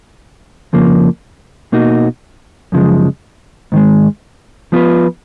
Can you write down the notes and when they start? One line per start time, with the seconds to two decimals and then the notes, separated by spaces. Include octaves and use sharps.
0.73 F2 C#3 F3 A#3
1.72 B2 A#3 D#4 F#4
2.72 F#2 C#3 F3 G#3
3.72 G#2 D#3 G#3
4.72 F3 B3 F4 B4